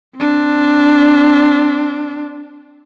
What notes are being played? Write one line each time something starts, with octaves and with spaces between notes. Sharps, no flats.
C4 D4